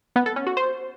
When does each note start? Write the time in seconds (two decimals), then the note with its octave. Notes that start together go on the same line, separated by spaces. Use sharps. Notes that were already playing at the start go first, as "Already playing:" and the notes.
0.16 B3
0.26 A4
0.36 C#4
0.47 F#4
0.57 C5